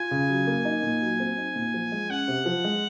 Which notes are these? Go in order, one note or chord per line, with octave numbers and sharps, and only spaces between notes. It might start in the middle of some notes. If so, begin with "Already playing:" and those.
Already playing: F4 G#5
C#3
F#3
A#3
D#4
A#2
F#3
C4
D#4
A#2
F3
G#3
C#4 F#5
C3
F3
G#3